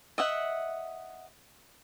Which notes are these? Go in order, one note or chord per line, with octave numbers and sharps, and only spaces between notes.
D#5 E5 F#5